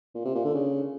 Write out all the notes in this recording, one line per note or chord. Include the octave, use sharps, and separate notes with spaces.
A#2
C3
A#2
D3
C#3